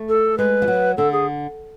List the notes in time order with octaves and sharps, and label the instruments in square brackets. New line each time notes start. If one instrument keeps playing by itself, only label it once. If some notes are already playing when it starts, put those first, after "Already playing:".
Already playing: [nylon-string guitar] A3
[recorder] A4
[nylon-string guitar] G#3 [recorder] B4
[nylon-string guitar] F3
F#3
[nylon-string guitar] D3 [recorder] A4
[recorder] G#4